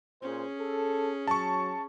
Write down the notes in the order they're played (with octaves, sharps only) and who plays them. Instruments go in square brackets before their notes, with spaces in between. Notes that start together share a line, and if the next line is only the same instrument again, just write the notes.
[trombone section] A#2 C5 [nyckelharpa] C#4 G#4
[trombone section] A4
[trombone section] F#3 [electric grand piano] A5 C#6